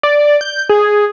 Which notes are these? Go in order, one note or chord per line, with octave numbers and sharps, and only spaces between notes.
D5
G6
G#4